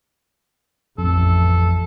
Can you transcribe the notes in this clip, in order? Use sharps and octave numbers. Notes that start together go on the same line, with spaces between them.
A1 F2 A4